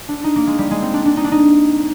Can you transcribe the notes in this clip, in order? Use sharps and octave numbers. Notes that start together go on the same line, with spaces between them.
D4
D#4
A#3
G#3
G3
G#3
C4
D4
D4
D#4
D4
D#4